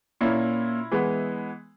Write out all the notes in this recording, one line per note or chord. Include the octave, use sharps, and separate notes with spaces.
A#2 A#3 C#4 E4
E3 G#3 B3